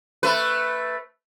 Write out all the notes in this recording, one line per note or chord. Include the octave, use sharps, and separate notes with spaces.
A3 B4